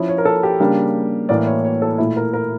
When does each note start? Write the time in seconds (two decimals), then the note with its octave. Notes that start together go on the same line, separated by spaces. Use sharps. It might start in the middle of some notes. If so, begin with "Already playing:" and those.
Already playing: F3 C#4 E4
0.09 C#5
0.18 A#4
0.25 A4
0.43 G4
0.60 C#3 G3 A#3 D4
1.29 A2 E3 A#3 E4 D5
1.47 C#5
1.64 C#5
1.82 A4
1.98 A#2 A3 E4
2.16 A#4
2.34 A#4